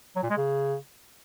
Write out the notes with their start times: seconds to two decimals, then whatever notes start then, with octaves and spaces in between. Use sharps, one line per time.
0.16 F#3
0.23 A#2
0.30 G#3
0.37 C#3